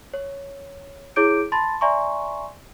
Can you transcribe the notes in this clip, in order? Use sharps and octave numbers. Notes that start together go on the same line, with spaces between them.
C#5
E4 G#4 C#5 D6 G6 D7
A5 B5 C6 A6
D5 E5 G#5 A#5 C6 C#6